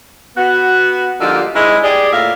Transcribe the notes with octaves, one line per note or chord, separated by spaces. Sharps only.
B3 F#4
D3 F3 G3 A#3 D#4 F4
G#2 G#3 C#4 E4 G#4 D#5
G4 G#4 D5
A2 A#3 F4 E5 F5